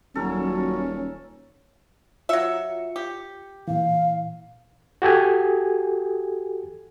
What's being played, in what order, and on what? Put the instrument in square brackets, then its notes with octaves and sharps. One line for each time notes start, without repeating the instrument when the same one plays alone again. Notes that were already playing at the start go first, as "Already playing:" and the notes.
[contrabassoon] D#1 [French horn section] F#3 [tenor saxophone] C#4 [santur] A4 A#4 C#5
[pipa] F#3 E5 [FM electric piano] F4 C#7
[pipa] G4
[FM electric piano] A#2 E3 [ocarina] F5
[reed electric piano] F#4 G4 A4 G#5